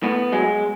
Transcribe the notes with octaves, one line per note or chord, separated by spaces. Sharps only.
A2 B3
F#3 G#3